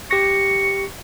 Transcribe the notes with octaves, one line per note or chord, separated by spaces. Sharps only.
G4 C#6 A#6